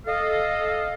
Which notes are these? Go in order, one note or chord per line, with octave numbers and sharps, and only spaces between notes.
A4 D#5 F5